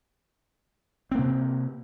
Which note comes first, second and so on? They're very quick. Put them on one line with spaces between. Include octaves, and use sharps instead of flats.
C4 A#3 C3